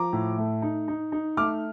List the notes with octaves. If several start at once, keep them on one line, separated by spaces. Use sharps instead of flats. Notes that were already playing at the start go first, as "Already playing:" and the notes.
Already playing: F3 A#5 D6
A2
A3
D#4
D#4
D#4
A3 D6 F6